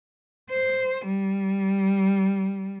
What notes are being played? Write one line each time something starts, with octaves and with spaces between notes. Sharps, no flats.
C5
G3